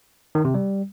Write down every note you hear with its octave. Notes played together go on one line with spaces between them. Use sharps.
D#3
C3
G3